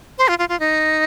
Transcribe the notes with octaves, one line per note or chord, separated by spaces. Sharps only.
C5
F4
F4
F4
D#4